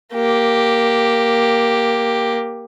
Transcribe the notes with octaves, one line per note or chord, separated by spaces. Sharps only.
A#3 G4